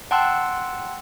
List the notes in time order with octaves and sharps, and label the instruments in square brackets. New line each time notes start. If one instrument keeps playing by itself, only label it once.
[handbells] F#5 G5 A5 C6 E6 F#6